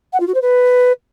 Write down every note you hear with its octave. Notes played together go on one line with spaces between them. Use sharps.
F#5
F4
F#4
C5
B4